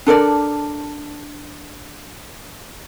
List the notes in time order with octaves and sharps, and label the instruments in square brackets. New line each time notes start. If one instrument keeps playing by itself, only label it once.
[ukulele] D4 A4 A#4 D5